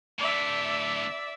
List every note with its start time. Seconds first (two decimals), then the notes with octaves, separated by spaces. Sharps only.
0.19 A2 D3 D5 E5